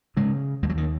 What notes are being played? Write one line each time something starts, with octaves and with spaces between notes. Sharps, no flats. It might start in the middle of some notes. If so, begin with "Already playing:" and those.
G#2 C#3 G#3
D#2 G#3
F#3
D#3